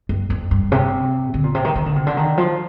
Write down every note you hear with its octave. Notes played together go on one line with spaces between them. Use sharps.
G2
F2
G2
C3
D3
A#2
C3
D#3
D#3
D3
C3
D3
D#3
F3